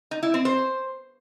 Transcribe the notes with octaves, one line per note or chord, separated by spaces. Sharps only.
D#4
E4
C4
C5